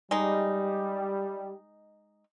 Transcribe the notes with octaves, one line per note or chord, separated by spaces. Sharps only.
G3 G#3 D#4